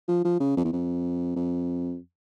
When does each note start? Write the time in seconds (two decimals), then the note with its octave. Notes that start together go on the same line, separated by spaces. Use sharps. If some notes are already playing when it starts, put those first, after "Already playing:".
0.08 F3
0.25 F3
0.40 C#3
0.57 F2
0.64 E2
0.73 F2
1.36 F2